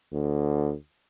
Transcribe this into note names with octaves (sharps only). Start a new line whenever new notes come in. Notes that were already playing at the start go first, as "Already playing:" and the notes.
D2